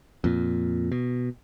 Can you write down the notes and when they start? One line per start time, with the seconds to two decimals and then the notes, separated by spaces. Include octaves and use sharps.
0.24 F2 A#2
0.92 B2